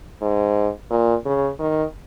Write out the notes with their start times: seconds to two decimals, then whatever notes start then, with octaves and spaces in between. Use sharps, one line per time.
0.21 G#2
0.90 A#2
1.25 C#3
1.59 D#3